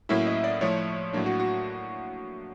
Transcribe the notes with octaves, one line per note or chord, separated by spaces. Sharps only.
A2 F#3 A#3 C#4 E4 E5
D#5
D5
A2 F3 A3 C#5
A2 F#3 A#3 D4
F#4
F#4